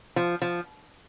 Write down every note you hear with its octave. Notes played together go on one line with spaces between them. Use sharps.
F3
F3